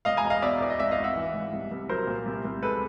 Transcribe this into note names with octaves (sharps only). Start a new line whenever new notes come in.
E1 D#5 F5
G#5 A#5
E1
D#5 F5
B2 D5 E5
E2 D5
D#5
G#1 D5 E5
D#5 F5
G#1
E5 F#5
E3
G#2
C2
C2
F#3 A#4 C5
A#2
C2
C2
G#3 A4 B4